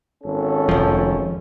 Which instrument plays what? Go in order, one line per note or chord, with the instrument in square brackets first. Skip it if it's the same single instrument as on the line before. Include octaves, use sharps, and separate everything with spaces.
[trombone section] G#1 C#4 A4
[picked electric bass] F1 F3